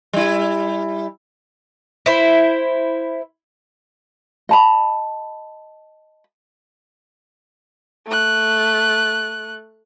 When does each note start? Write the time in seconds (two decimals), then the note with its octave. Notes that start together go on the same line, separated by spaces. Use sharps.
0.13 G3 E4
2.06 E4 C5
4.49 D#5 A5 B5
8.07 A3 F#6